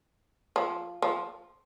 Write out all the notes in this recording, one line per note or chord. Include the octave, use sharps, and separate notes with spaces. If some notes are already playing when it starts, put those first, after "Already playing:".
F3
F3